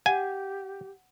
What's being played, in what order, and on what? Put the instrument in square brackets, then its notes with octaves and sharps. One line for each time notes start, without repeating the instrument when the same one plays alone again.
[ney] G4 [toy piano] F#5 [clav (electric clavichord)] G#5